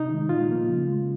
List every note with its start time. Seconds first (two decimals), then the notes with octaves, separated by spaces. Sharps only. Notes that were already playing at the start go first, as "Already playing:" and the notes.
Already playing: C3 D#4
0.10 D#3 G#3
0.29 A#2 F4
0.49 F3 A#3
0.68 C#3
0.88 G#3